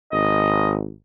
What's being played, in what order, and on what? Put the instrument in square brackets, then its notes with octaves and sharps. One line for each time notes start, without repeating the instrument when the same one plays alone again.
[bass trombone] G#1 [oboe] D#5